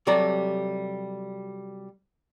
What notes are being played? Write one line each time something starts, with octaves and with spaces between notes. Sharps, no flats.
C3 F#3 G3 A4 D5 A#5